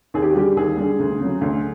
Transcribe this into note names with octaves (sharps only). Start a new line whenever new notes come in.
D#2 G#4
G4
F#4
D3 G3 G4
D#2 G#4
D3 G3
D2
C#3 F#3
D2